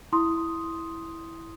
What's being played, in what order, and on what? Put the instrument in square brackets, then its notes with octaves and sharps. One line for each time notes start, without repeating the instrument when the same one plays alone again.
[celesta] E4 C6 D#6